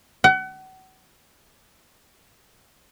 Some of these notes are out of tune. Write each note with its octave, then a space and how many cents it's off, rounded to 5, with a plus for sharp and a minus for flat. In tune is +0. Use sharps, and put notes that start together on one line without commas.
F#5 +35